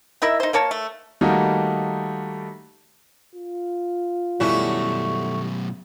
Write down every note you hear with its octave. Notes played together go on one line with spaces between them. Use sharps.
D#4 E4 A#4 E5
D#4 C5
A#3 A#4 C#5 A5
A3
D#3 G3 A3 A#3 D#4 F#4
F4
F#2 B2 G3 A3 C#4 E4 F#4